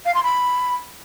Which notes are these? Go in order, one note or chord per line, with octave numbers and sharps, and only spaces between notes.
F5
C6
B5